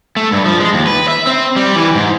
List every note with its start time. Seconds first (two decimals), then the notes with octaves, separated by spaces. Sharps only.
0.16 A3
0.32 G2
0.46 F3
0.61 G#3
0.74 D#2
0.87 B4
1.08 E5
1.27 C4
1.56 G3
1.76 E3
1.95 G#2